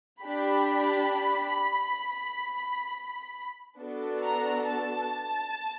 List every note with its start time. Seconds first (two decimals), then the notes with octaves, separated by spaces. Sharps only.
0.22 D4 G4 B5
3.79 B3 D4 F#4 A4
4.23 A#5
4.69 A5